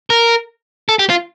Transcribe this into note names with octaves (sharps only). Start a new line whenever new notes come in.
A#4
A4
G4
F4